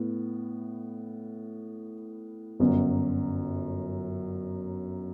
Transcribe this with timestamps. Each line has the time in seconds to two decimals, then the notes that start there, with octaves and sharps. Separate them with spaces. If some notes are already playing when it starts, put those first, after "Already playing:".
Already playing: A2 B3
2.60 G1 F#2 F#3